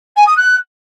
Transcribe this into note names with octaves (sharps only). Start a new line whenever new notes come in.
G#5
D#6
F#6